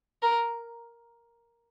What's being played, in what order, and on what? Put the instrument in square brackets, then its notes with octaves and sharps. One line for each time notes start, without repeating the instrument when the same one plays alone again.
[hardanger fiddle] A#4